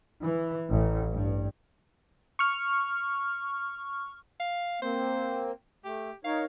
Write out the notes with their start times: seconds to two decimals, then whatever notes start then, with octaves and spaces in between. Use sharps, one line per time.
0.22 E3
0.70 A1
1.11 G2
2.39 C#6 F6
4.40 F5
4.82 A#3 C4 C5
5.85 A3 G4
6.25 D#4 A#4 C#5 F5